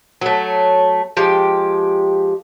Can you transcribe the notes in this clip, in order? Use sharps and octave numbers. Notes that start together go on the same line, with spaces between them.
F#3 A3
F3 G#3 G4